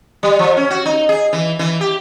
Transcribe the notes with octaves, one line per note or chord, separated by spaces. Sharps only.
G3
F3
C#4
F#4
D#4
G#4
E3
E3
G4